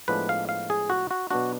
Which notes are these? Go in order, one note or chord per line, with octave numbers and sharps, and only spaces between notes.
A2 F3 G#3 B3 D4 B4
F5
F5
G#4
F#4
F#4
B2 F#3 B3 D4 F#4